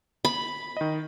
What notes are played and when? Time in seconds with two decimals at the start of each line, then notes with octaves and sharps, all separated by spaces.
0.25 B5
0.77 D#3 D#5